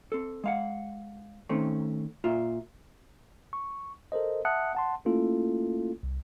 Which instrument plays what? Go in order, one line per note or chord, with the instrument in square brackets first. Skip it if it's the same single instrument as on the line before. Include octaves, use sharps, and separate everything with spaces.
[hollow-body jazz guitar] C4 A4
G#3 F5 F#5
D#3 A3 C4 C#4
A#2 F4 E5
[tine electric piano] C#6
A4 A#4 C5 D#5
E5 F#5 A5 D#6 F#6 C#7
F#5 A5 C6
A3 A#3 C#4 E4 F4 A4
C2